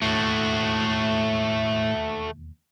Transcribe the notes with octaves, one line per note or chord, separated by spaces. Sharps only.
E1 D#2 A2 A3 F#4